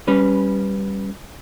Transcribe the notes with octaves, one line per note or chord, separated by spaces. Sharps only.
G3 C#4 B4